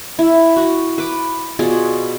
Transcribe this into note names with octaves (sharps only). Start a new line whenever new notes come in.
E4
F#4
B4 D6
B2 F4 G#4 D5